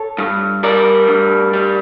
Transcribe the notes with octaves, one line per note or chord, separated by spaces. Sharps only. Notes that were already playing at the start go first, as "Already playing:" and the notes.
Already playing: A4 C#5
G2
G3 A#4 D5
G2
G3